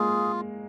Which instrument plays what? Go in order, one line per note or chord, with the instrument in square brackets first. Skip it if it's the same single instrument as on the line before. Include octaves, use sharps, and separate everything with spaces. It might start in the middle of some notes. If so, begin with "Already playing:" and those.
Already playing: [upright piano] G#3 A#3 [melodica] F4 G#4